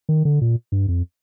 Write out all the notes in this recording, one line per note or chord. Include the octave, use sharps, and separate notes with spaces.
D#3
D3
A#2
G2
F2